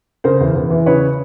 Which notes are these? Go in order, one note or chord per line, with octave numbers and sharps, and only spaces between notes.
C#3 A#4 C5
E2
E2
E3
C#3 B4 C#5